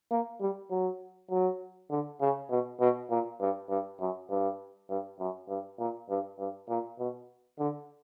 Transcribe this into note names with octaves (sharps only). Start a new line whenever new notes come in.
A#3
G3
F#3
F#3
D3
C#3
B2
B2
A#2
G2
G2
F#2
G2
G2
F#2
G2
A#2
G2
G2
A#2
B2
D3